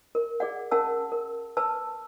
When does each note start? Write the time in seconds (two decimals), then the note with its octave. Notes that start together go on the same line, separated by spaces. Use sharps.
0.15 A#4
0.40 G#4 D5 F#5
0.71 C#4 A#4 F#5 A5 E6
1.12 A#4
1.57 B4 A5 E6